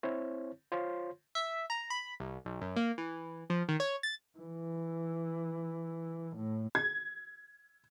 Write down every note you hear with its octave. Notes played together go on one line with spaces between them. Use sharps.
C4 E4 C5 C#5
F4 C5 C#5 C6
E5
A#5
B5
C2
B1
F#2
A#3
E3
F3
D#3
C#5
A6
E3
A2
G#6